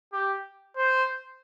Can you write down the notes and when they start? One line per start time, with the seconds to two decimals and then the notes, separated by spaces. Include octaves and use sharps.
0.13 G4
0.76 C5